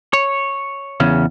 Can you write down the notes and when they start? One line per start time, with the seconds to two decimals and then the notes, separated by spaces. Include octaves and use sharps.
0.13 C#5
1.00 E2 C#3 C#4